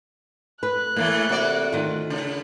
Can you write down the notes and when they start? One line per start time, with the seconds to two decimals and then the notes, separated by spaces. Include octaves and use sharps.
0.63 B4 F#6
0.96 A2 E3 A3 A#3
1.29 C3 F#4 D5
1.72 D2 D#3 F4
2.10 C#3